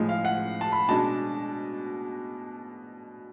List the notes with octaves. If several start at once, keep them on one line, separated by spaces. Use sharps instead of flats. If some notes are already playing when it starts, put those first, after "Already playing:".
Already playing: A2 F3 G#3
F5
F#5
A5
B5
B2 G#3 D4 A5